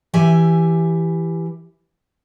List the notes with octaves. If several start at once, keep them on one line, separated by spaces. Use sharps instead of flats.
E3 G4 E5 G#5